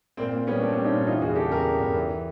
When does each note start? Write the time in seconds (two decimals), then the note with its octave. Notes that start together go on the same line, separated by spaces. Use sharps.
0.17 A#2 A#3 C4
0.32 A#2
0.47 G3 B3 C#4
0.62 A#3 C4 D4
0.73 C4 D4
0.77 G3
0.84 C#4 D#4
0.92 A#2
1.06 E3 D#4 F4
1.21 E2 F#4 G#4
1.36 C#3 G4 A4
1.50 E2 G#4 A#4
1.66 C#3
1.81 E2
1.95 E3